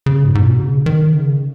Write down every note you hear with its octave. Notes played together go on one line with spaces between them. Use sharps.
C#3
G#2
G#2
B2
C#3
D#3
C#3